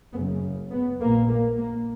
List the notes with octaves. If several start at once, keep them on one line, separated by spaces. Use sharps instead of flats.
F#1 F#2 C#3 B3
B3
A#1 A#2 A#3
A#3
A#3